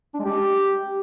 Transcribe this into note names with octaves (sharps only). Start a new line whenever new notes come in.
D4
G#3
G4